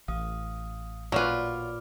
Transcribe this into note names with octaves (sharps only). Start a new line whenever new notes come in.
A1 F5 D#6
A#2 F#3 C#4 F4 B4 D5 D6 F6